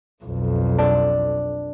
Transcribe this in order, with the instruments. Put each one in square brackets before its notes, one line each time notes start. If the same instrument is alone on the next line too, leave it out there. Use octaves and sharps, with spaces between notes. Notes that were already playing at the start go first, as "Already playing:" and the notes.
[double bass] B1 F2
[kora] D4